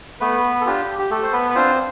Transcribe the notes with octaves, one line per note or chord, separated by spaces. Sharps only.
A3 B3 B4
A4
D4 F4 G4
G4
A3 A4
C5
B3 B4
B4
C4 D4 F4 C5